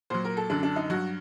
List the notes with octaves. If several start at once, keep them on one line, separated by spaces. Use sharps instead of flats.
A#2 F#3 C5
A#4
A4
F#2 D3 F#3 D4
D4
D#4
G2 F#3 F#4